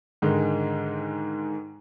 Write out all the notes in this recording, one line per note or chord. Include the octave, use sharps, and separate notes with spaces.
G#2 D3 D#3 G#3 D#4